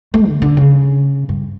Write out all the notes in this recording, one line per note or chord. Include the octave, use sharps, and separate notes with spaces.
A3
D3
D3
C#3
G2